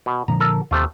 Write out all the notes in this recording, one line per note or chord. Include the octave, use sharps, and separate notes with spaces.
B2
A#2 D3 F3 A#5
A4 A#4
D#2 C3 A3 F4